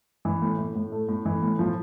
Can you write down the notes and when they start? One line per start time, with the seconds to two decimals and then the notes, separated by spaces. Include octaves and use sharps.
0.25 E3
0.42 A2
0.59 A2
0.75 A2
0.92 A3
1.09 A2
1.25 E3
1.42 A2
1.59 F3